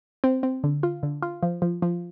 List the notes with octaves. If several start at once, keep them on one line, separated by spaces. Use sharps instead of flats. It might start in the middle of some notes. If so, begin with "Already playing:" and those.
C4
C4
D3
F4
D3
F4
F3
F3
F3